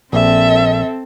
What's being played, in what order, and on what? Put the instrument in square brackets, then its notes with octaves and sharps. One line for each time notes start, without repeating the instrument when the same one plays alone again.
[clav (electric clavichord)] A#1 [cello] C4 A4 [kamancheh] E5